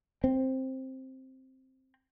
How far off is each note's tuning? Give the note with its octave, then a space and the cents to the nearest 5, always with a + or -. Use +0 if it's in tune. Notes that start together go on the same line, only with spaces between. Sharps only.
C4 +5